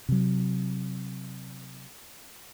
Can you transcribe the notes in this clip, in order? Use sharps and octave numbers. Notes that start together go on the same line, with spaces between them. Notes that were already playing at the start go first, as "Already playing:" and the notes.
C3 F#3